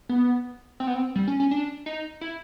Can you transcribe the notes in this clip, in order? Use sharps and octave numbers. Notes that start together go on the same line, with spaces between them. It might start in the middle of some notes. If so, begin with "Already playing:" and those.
B3
C4
B3
C4
G3
C#4
C#4
D4
D#4
E4